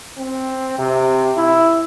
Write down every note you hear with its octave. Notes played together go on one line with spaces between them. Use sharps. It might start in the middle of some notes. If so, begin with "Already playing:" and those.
C4
C3
E4